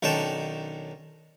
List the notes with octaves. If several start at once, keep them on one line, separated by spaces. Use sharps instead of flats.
B1 D#3 C#4 D4 G5 A5